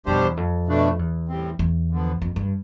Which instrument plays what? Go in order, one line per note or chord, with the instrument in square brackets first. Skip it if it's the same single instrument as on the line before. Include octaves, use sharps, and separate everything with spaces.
[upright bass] F2 [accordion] B2 G3 D4 G4 C5
[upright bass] E2
F2
[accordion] B2 A3 D4
[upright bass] E2
[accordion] A2 G3 C4
[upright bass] E2
[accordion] D3 F3 B3
[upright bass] F2
G2